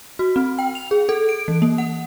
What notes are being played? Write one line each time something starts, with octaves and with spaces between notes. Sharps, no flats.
F#4
C4
G5
F7
G#4
A4
D7
E3
A#3
F#5